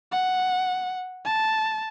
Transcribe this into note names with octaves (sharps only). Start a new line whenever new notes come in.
F#5
A5